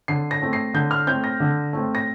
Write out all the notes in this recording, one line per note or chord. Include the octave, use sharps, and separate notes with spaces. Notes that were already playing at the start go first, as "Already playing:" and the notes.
D3 C7
A#6
A3 C4
C7
D3 G6
F6
A3 C4 G6
A#6
D3
A3 C4
A#6